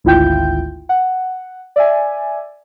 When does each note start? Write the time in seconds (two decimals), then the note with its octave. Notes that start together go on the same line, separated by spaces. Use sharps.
0.04 G#1 D2 E4 F4 G5 G6
0.89 F#5
1.76 D5 E5 G#5